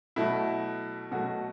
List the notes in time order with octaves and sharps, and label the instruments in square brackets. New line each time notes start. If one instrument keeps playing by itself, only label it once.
[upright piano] B2 F#3 A3 E4
B2 F#3 A3 F#4